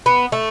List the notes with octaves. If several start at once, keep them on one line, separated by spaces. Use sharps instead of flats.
B3
A3